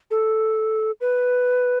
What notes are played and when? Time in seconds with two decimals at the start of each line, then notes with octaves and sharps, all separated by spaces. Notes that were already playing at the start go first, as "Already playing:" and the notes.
0.11 A4
1.01 B4